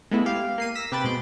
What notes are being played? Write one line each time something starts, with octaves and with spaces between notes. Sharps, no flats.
G#3 A3 B3 E4
G4 F5
A#3 C7 D#7
E6 A#6 B6
C3 G4 B4 G5 B5 A6
B2 G#3 C6 D7